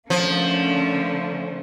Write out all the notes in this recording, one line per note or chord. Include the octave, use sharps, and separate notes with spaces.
D3 F3 A3 A#3 C#4